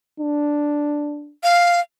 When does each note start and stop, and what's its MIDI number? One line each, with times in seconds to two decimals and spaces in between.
0.20 1.33 62
1.43 1.80 77